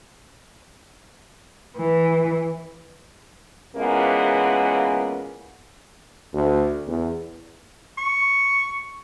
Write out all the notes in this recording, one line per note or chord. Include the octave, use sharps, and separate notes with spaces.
E3
A#2 C#3 E3 G#3 A#3 B3
D2
E2
C#6